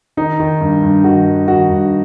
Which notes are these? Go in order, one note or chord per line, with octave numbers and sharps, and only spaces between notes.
D#3 D#4
D#3
G2
G2
D#3 F#4
G2
D#3 F#4
G2